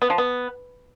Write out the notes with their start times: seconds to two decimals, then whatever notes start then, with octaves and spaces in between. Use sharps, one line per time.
0.02 B3
0.10 F3
0.18 B3